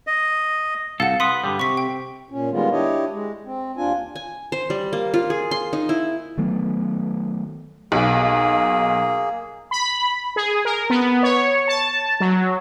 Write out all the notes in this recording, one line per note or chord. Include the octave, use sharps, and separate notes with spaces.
D#5
C2 A4 F5 F#5
B4 C6 D#6
G2 D3 G3
C3 C#6 B6
G5
A#2 C#4
D#3 G3 G#3 B3 F4
D4 E4 G4 C#5 D#5
G#3
C4
D#2 D4 F4 G#5
G#5
C5
G3
A#3
F4
G#4
C6
D#4
E4
D#3 F#3 A3 B3
B1 A#3 G#4
B5
G#4
A#4
B3
C#5
A5
F#3